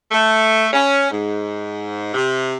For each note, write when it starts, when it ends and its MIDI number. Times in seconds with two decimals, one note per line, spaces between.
0.12 0.67 57
0.73 1.11 61
1.12 2.11 44
2.14 2.56 48